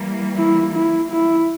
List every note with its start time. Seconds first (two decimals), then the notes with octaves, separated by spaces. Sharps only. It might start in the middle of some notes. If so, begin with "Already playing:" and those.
Already playing: E3 G3 A#3
0.37 E4
0.74 E4
1.11 E4